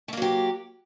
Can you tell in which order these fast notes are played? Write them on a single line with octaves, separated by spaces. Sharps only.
A3 A#3 F#3 G4